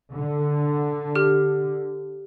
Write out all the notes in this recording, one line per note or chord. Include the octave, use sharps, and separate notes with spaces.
D3
G4 F6